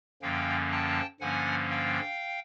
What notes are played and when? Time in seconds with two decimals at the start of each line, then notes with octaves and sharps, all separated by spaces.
0.22 F#2 D3 F3 A#3 C#4 F5 G5
0.71 G5 A5
1.20 G2 D3 F3 A#3 C#4 F#5 G#5
1.70 F5 G5